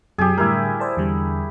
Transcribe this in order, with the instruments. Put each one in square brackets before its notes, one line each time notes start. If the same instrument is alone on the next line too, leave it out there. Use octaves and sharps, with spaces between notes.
[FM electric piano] F#2 C3 F#3 [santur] G4 G#4
[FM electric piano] A2 D3 G3 [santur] E4 A#4
[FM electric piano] C5 D5 A5
E2 D3 G3